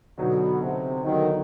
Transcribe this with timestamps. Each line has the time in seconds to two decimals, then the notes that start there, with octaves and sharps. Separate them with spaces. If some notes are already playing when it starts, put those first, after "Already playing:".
0.18 B2 D3 F#3 B3 D#4
0.61 C3
1.04 D3 D#3 F#3 B3 D#4